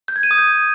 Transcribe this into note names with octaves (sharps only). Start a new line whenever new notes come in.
G6
G#6
D#7
D#6
G6